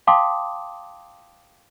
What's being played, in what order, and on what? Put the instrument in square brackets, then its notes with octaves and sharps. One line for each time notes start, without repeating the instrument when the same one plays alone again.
[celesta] F5 G5 A5 C6 D6 D#6